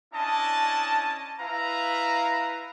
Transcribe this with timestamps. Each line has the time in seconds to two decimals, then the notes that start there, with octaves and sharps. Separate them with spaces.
0.14 C#4 D4 E4 D#5 A5
1.40 E4 B4 F5 A#5